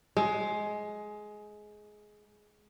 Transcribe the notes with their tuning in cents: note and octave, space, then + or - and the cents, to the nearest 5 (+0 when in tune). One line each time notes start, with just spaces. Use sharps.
G#3 +15